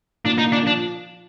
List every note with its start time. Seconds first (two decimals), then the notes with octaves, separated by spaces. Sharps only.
0.25 A#2 D4
0.38 D#4
0.44 A#2
0.52 D4
0.62 F3 D4